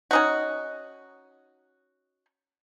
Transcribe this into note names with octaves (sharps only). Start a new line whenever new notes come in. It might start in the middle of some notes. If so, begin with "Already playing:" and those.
C#4 D#4 F#4